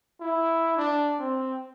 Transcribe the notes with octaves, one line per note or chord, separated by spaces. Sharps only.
E4
D4
C4